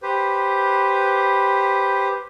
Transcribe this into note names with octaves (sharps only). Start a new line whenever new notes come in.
G4 B4 C5